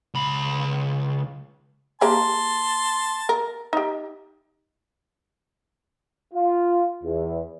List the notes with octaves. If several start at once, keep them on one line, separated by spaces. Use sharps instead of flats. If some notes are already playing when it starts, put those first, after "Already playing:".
C#2 B5
A#3 G4 G#4 A5 C6
A#4
D#4 G4
F4
E2